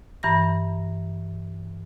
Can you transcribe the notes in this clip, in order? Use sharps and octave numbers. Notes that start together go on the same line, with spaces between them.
G2 E3 A#5 A#6